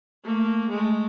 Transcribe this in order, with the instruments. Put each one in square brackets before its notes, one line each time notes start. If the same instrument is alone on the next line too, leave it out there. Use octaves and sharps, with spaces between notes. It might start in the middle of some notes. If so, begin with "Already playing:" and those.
[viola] A3 A#3
G#3 A3